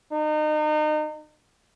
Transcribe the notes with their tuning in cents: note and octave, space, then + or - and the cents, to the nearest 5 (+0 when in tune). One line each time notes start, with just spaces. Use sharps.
D#4 -30